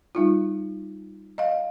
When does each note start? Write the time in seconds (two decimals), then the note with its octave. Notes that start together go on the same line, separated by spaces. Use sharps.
0.15 G3 D#4 F4
1.38 D#5 F5